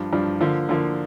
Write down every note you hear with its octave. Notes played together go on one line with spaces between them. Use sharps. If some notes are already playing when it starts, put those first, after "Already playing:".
Already playing: G2 F3 D4
G2 F3 D4
D3 F3 A#3
D3 F3 A#3